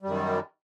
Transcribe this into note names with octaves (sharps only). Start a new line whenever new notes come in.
F#2 D#3 G3